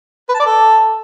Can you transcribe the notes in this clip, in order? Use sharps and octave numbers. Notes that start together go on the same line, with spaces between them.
B4
A5
D5
A4